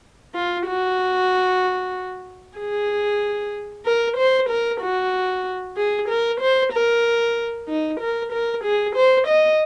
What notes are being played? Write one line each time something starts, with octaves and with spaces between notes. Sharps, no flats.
F4
F#4
G#4
A#4
C5
A#4
F#4
G#4
A#4
C5
A#4
D#4
A#4
A#4
G#4
C5
D#5